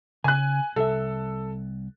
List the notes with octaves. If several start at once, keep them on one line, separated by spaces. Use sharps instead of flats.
C#3 G#5 F#6
C2 A4 E5